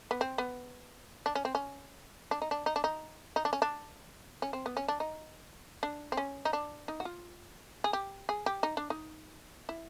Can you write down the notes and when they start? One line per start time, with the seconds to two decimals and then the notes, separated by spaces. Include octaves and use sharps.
0.11 B3
0.21 C4
0.38 B3
1.26 D4
1.35 C#4
1.45 C4
1.55 C#4
2.31 D4
2.42 D#4
2.51 D4
2.66 D#4
2.76 D4
2.84 D#4
3.36 D#4
3.45 D4
3.53 C#4
3.62 D4
4.42 C#4
4.53 C4
4.66 B3
4.77 C#4
4.88 D4
5.00 D#4
5.83 D4
6.12 C4
6.17 C#4
6.45 D#4
6.53 D4
6.88 D#4
7.00 F#4
7.05 F4
7.84 G#4
7.93 G4
8.29 G#4
8.46 G4
8.63 D#4
8.77 D4
8.90 D#4
9.69 E4